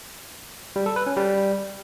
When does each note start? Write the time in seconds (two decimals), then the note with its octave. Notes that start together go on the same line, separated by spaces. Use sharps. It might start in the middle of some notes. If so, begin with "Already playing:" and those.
0.76 G3
0.86 A4
0.96 B4
1.06 C#4
1.17 G3